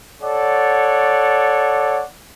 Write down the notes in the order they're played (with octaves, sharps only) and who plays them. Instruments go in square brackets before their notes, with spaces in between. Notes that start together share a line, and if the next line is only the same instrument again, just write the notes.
[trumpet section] A4 C#5 D5 F#5